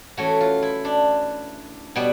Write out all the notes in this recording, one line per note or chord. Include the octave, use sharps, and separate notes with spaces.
E3 A3 C#4 F#4
F4
E4
D4
B2 G3 B3